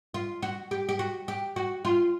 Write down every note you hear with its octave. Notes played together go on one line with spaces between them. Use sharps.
F4
F#4
G4
G4
F#4
G4
F#4
F4